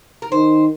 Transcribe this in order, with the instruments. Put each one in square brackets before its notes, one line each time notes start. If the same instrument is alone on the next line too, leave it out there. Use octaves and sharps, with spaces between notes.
[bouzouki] A#4
[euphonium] D#3 [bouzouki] C5